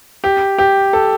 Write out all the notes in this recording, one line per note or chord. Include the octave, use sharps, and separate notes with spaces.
G4
G4
A4